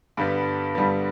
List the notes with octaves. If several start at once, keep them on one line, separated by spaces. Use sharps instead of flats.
G2 D3 G3 B3
G2 D3 G3 B3